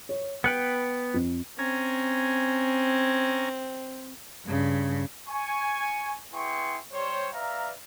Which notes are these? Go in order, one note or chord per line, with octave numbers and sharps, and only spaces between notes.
C#5
B3 B4 G5 C#7
F2
C4 C#4 G#5 A#5
G2 C#3
G#5 C#6
B3 E4 G#4 G5 C6 C#6
G3 C5 C#5
B4 D5 E5 F5 A#5